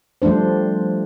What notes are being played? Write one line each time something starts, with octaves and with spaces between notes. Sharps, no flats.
F3 G3 A3 D4 C5